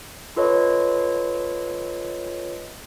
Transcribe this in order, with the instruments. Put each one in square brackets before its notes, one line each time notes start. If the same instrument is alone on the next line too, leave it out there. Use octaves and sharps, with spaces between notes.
[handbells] F4 A4 B4 C#5 D#5